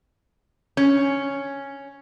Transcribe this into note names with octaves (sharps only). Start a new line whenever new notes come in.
C#4